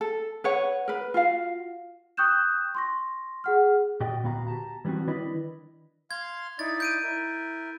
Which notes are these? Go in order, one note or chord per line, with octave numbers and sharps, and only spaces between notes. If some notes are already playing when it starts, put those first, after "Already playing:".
A4
B4 C#5 F#5
A#4 B4
F4 F#4 F5
G5 C#6 D#6 F#6 G6 E7
C6 C#6 A#6
G#4 F#5 F6
A#2 F#4 G4 D5 D#5 G5
D2 A#2 B3 F#4 F5 A#5
G4 A5 A#5
E3 G3 B3 C4 F#4
D#3 D4 E4 B4 D5 D#5
F5 C6 G#6
D#4 E4 D5 A6
G6 D7 D#7
E4 A#4